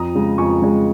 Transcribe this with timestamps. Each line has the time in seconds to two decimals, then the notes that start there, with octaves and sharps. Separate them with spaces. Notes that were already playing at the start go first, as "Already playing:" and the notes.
Already playing: F2 A#5 D#6
0.15 C#3 G#3
0.38 F2 G#5 C#6
0.62 C#3 G#3